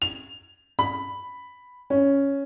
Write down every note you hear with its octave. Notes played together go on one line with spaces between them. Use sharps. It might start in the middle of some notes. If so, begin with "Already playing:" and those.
F7
B5
C#4